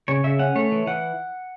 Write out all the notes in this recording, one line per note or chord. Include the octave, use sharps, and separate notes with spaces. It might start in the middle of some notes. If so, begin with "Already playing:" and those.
C#3 C#5
C#3 E5
C#4 F#5
A3 C#5
E3
E3 F#5